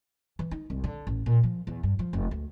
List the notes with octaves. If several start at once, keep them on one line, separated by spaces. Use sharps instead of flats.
E3
D#4
C2
D3
A1
A#2
F3
E2
G2
F3
F1
D2